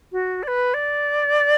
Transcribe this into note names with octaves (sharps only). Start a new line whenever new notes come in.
F#4
D5
B4
D5